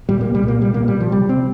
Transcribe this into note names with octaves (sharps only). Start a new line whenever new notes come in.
A#2 G3
C2 A#3
G3
A#2
A#3
C2 G3
A#2 A#3
G3
A#2
F3
C3 G3
C3 C4